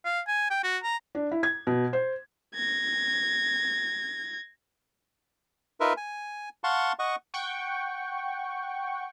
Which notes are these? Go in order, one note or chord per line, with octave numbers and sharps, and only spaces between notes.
F5
G#5
G5
F#4
A#5
D4
E4
G#6
B2
C5
G#6 A#6
D#4 F4 A#4 B4 E5
G#5
F5 F#5 A5 C6 C#6
D#5 F#5 C#6
F#5 G5 C#6